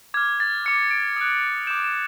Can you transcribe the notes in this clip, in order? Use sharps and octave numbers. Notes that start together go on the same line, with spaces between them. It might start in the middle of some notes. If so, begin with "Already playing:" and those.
D6 F6 G#6
A6
D6 F6 C#7
D7
D#6 F#6
D6 G6 E7
E7